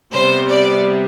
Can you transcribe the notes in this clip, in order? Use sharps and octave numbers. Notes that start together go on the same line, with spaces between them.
C3 G3 B3 C5
D5